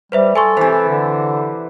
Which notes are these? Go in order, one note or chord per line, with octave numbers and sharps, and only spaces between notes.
G3 B4 C5 E5
A4 G#5 C6 C#6
C3 E3 C5
D3